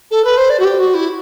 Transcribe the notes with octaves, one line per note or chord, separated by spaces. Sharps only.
A4
B4
C5
D5
F#4
G4
F#4
E4